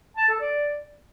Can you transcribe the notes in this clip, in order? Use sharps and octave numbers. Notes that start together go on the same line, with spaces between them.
A5
A4
D5